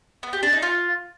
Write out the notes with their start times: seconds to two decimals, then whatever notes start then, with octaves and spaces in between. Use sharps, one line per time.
0.23 B3
0.33 G4
0.43 D4
0.53 D#4
0.62 F4